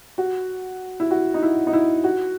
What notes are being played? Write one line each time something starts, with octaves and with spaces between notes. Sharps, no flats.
F#4
E4
F#4
D#4
E4
D#4
E4
F#4